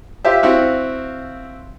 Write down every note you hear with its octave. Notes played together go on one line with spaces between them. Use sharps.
F4 G4 C5 E5
C4 E4 F#4 F5